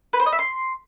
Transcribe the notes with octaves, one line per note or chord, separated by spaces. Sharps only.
B4
C5
D#5
E5
C6